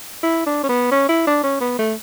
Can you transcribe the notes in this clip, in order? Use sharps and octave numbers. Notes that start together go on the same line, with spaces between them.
E4
D4
C#4
B3
C#4
E4
D4
C#4
B3
A3